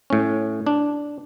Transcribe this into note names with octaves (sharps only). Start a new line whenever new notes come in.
A2 C#4
D4